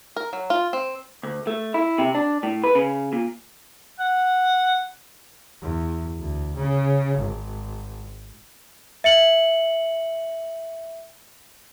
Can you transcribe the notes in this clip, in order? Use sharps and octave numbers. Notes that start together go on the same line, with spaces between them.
A#4
F#3
F4
C4
D2
A3
E4
C3
D4
A2
B4
C#3
A#2
F#5
E2
D2
C#3
G#1
E5 C#7 F#7